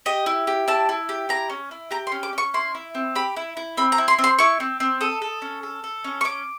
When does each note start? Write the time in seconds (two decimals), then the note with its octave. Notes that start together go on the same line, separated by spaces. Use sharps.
0.06 G4 D#5
0.26 E4
0.47 G4
0.68 E4 A5
0.89 E4
1.09 G4
1.29 E4 A#5
1.50 C#4
1.71 E4
1.91 G4 A#5
2.07 C6
2.12 C#4
2.23 D6
2.33 C#4 C#6
2.54 E4 C6
2.75 E4
2.95 C4
3.15 G4 B5
3.36 E4
3.57 E4
3.77 C4 B5
3.92 A#5
3.98 E4
4.08 C6
4.19 C4
4.24 C6
4.39 E4 C#6
4.60 C4
4.80 C4
5.01 A4 D#6
5.22 A4
5.42 C#4
5.63 A4
5.84 A4
6.04 C#4
6.21 C#6
6.24 C#4 D6